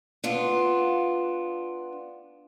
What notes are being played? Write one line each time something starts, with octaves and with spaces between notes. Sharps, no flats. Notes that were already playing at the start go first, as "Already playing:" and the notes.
B3 D4 F4